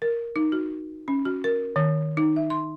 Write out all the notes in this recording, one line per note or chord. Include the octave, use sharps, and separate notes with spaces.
A#4
D#4
F#4
C#4
F#4
A#4
D#3
D#4
E5
C6